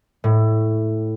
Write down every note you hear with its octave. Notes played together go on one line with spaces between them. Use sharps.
A2